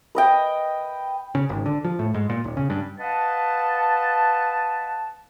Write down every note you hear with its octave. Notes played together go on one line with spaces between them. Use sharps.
B4 D#5 G5
C#3
G#1
D3
F3
A2
G#2
A#2
D#1
C#3
G2
B4 D#5 F5 F#5 A5